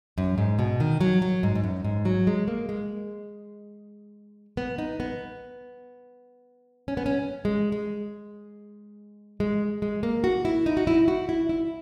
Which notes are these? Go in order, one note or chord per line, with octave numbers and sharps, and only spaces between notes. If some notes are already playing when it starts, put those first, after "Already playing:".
F#2
G#2
B2
D#3
F#3
F#3
G#2
G#2
F#2
G#2
F#3
G#3
A#3
G#3
B3
D#4
B3
C#4
B3
C#4
G#3
G#3
G#3
G#3
A#3
F#4
E4
D#4
F#4
E4
F#4
E4
E4